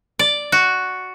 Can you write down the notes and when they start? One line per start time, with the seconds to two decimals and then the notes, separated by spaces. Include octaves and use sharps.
0.19 D5
0.52 F#4